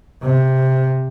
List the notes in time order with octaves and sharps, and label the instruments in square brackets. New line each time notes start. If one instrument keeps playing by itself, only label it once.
[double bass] C3